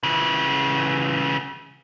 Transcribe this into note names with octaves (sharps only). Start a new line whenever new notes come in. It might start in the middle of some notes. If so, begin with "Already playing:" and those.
C#3 E3